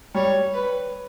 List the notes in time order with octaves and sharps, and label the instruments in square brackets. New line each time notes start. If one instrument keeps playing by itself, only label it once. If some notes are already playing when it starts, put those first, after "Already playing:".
[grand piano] G3 [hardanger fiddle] C#5
[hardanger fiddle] B4